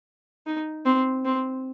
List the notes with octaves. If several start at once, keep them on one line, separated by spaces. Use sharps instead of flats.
D#4
C4
C4